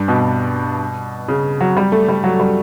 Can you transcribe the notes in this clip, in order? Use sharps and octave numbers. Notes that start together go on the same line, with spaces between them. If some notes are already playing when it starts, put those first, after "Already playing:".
Already playing: G2
B2
C#3
F#3
G3
A3
G3
F#3
G3